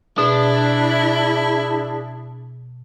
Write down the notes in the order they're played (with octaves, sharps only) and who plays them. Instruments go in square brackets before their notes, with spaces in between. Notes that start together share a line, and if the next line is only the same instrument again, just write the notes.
[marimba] B2 [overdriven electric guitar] D4 [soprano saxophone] E4 [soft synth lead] G#4